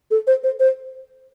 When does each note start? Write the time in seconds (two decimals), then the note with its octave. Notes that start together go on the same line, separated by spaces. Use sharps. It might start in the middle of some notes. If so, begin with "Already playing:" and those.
0.11 A4
0.27 C5
0.43 C5
0.60 C5